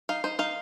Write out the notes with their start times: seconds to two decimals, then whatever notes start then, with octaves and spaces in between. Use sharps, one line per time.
0.09 D#4 F5
0.24 D#4 C5
0.39 D#4 F5